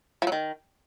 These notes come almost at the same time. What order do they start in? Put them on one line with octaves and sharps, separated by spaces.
F3 F#3 D#3